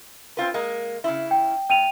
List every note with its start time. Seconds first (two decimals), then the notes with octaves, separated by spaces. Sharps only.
0.37 C4 F4 B4
0.54 G#3 A#3
1.04 C#3 E4
1.31 G5
1.70 E2 G5 D#7 F7